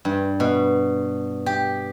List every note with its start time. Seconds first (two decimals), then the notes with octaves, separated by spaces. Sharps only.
0.05 G2
0.40 B2
1.46 G4